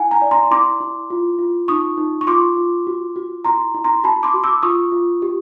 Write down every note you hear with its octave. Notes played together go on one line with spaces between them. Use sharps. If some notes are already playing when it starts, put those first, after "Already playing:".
Already playing: E4 F#5 G#5
G#5 A#5
D5
A#5 C6
E4 C6 D6
E4
F4
F4
D#4 C#6 D#6
D#4
C#6
F4 C6 D6
F4
F#4
F#4
E4 A#5 C6
E4
A#5 C6
F#4 A5 B5
C6 D6
F#4
D6 E6
F4 C#6 D#6
F4
G4